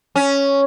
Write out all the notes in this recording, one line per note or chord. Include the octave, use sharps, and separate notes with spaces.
C#4